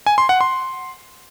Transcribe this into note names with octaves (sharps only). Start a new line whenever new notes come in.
G#5
C6
F#5
C6